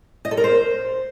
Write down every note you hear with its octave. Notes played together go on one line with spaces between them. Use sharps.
D#5
A4
A#4
C5